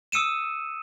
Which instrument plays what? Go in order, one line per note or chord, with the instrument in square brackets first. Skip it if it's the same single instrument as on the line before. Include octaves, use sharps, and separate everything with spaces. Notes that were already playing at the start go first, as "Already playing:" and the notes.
[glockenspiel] D#6 E6 C#7 D#7 E7